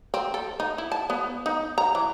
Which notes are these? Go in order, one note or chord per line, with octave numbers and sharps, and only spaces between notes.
C4
A4
D#4
E4
A5
B3
D#4
A#5
E3